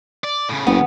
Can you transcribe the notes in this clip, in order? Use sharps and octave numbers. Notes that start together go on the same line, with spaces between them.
D5
A2 C#3
F#1 B3